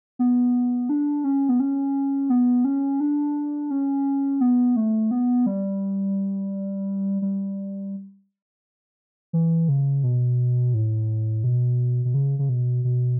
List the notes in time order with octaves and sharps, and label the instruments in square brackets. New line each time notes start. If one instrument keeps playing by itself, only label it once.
[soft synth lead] B3
D4
C#4
B3
C#4
B3
C#4
D4
C#4
B3
A3
B3
G3
G3
E3
C#3
B2
A2
B2
B2
C#3
C#3
B2
B2